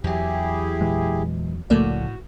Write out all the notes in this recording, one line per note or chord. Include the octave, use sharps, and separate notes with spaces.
E2 F#3 E4 G4 G#4
A#2 E3 G#3
C2 A2 C#3 F3 A3 A#3 F#4 D5